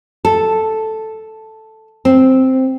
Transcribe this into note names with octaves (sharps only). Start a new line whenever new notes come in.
A4
C4